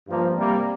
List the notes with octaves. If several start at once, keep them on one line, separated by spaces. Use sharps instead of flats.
G2 F3 A#3
C3 G3 A#3